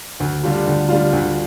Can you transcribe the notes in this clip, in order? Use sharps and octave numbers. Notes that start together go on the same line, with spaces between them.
D2
D3 G3 D4 F4
D2
D3 G3 D4 F4
D2